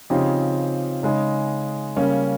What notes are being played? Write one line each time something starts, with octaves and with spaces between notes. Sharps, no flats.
C#3 F3 C4 D#4 G4
C#3 G#3 D#4
C#3 G3 A#3 C#4